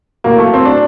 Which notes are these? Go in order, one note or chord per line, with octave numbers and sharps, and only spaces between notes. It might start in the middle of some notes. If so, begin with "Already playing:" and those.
A2 F#3 A#3
A3
C4
D4